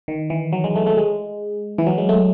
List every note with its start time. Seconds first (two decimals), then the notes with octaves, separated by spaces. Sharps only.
0.08 D#3
0.30 E3
0.53 F#3
0.64 G#3
0.76 A3
0.87 A3
0.97 G#3
1.78 E3
1.87 F#3
1.98 G#3
2.09 A3